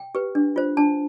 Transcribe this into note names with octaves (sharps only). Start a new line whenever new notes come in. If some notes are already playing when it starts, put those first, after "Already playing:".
Already playing: G5
G4 B4
D4
F4 C5
D4 A5